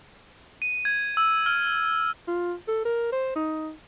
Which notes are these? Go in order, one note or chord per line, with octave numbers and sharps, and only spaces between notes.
D#7
G#6
E6
F6
F4
A4
A#4
C5
D#4